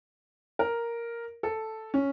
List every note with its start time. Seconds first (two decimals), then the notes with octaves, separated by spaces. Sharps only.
0.59 A#4
1.43 A4
1.94 C#4